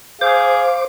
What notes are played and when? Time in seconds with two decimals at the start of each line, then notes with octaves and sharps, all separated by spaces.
0.21 G#4 C5 F5 D6